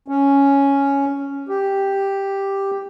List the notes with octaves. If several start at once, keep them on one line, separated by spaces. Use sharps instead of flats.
C#4
G4